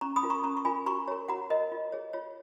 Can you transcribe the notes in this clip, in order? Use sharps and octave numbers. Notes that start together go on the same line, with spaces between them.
C#4 A#5 C#6
B5 D#6
F4 A#4
A#5 C#6
C#4 A#5 C#6
C#6
F4 A#4 G#5 B5
F#4 A#5 C#6
A#4 C#5
F#4 F#5 A#5
A#4 C#5 D#5
F4
G#4 C#5
F4 C#5